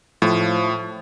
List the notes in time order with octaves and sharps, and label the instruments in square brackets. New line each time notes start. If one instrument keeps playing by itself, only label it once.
[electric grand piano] A2 [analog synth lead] F3